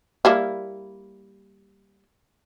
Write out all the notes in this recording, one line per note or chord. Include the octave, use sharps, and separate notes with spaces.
G3 A#3 E4